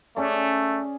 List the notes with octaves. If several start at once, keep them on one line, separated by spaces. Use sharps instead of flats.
A3 C#4 G#4 D5